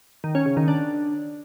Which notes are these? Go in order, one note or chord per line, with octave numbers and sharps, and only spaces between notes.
D#3
C#4
C#3
D#3
D4